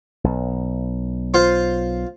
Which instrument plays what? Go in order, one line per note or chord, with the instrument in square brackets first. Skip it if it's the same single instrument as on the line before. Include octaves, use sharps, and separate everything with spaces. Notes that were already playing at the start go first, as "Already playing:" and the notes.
[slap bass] B1
[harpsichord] F4 C5